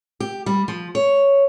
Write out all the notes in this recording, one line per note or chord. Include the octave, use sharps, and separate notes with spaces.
G4
G3
F3
C#5